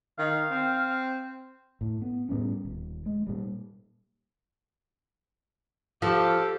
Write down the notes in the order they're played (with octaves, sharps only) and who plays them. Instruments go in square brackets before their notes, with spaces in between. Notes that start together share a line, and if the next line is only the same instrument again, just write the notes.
[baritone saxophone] D#3 [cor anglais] F5
[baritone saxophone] C4
[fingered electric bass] A2
B3
A2 G3 B3 C#4
D#1
G#3
A#2 G3
[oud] F3 [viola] G4 [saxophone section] A4